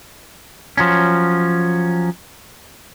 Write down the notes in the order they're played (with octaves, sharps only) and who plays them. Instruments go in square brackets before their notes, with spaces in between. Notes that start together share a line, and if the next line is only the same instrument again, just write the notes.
[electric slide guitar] F3 F#3 C#4